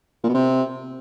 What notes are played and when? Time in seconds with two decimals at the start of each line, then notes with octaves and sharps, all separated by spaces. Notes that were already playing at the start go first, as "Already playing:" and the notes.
0.24 A#2
0.29 B2
0.34 C3